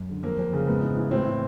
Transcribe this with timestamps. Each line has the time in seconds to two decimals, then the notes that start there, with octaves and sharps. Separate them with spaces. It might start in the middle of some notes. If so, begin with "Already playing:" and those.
Already playing: F#2
0.09 D3
0.23 F2 A#3
0.38 F2
0.53 C#3
0.67 G#2 B3
0.81 E3
0.97 E3
1.11 A2 C4
1.25 E3